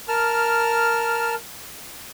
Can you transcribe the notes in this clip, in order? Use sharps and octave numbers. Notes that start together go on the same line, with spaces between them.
A#4 A5 F6